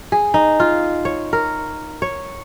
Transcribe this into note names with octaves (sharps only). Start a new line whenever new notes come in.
G#4
D#4
F4
C#5
A#4
C#5